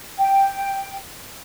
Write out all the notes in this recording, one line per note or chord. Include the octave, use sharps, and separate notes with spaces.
G5